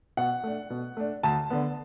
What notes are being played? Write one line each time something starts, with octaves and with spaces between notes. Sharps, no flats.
B2 F#5
A3 D4
B2
A3 D4
D2 A5
D3 B3